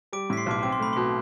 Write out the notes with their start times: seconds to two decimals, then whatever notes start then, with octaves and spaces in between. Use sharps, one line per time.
0.13 G3 D6 D7
0.30 A2 B6
0.37 C6 C7
0.46 B1 D6
0.63 C4 D6
0.72 C6
0.80 A3 B5
0.93 B2 C6